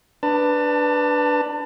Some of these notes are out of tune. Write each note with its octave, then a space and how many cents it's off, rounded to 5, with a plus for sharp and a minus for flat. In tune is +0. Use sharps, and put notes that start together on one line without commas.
D4 +0 B4 +0 A5 +30